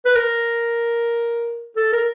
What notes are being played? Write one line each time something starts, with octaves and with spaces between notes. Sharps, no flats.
B4
A#4
A4
A#4